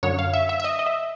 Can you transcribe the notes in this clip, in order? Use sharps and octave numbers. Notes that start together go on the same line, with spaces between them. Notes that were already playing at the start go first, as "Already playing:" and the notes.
F#2 D3 F#3 C#5
F5
E5
E5
E5
D#5
D#5
E5